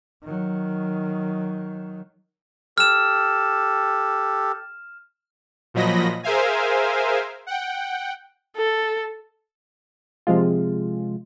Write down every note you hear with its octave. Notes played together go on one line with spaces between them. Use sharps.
D#3 F#3
G4 A4 F6 E7
A#2 F3 F#3 D#5 B5 A#6
G#4 A#4 C5 E5 F5 G#5
F#5 G5
A4
C3 F3 G#3 F4